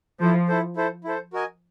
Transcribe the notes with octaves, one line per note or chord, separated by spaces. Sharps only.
F3 E4 A4 C5
E4 A4 C5
E4 A4 C5
E4 A4 C5
F#4 A#4 D#5 G#5